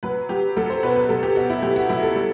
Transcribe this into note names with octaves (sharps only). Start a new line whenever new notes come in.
F#3 B4
F#3 G4
F#3 A4
C5
B2 B4
B4
F#3 A4
G4
B2 F#4
E4
F#3 G4
F#4
F#3 E4
A4
G3